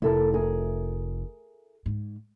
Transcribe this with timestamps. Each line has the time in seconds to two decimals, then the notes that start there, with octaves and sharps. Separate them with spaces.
0.02 F1 E4 A4 A#4
0.34 G#4 A#4
1.86 G#2